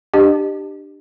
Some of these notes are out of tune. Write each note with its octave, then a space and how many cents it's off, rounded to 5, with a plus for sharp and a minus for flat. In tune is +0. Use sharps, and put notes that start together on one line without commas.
D4 +20 G4 +0 D#5 -35